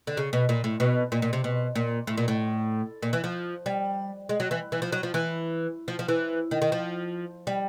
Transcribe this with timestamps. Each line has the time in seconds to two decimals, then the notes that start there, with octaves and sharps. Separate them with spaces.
0.07 D3
0.17 C#3
0.33 B2
0.49 A#2
0.64 A2
0.80 B2
1.12 A#2
1.22 A#2
1.33 C3
1.44 B2
1.76 A#2
2.07 A2
2.17 A#2
2.28 A2
3.03 A#2
3.13 E3
3.24 F3
3.66 G3
4.29 G#3
4.40 F#3
4.51 E3
4.72 E3
4.82 F3
4.92 F#3
5.03 F3
5.14 E3
5.88 F3
5.99 F3
6.08 E3
6.51 D#3
6.62 D#3
6.72 F3
7.47 G3